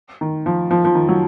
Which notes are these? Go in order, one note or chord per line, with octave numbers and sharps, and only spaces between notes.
D#3
F3
F3
F3
D#3
F#3